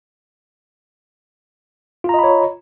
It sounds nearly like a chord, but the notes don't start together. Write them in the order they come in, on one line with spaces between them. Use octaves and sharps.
F4 A#5 D#5 B5 C#5